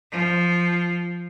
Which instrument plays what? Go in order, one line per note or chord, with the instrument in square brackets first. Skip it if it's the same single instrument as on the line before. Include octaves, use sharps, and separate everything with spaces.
[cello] F3